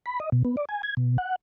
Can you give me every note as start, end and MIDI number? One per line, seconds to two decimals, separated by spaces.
0.06 0.19 83
0.20 0.30 75
0.32 0.43 47
0.45 0.56 59
0.57 0.65 74
0.69 0.82 80
0.83 0.95 92
0.97 1.17 47
1.18 1.36 78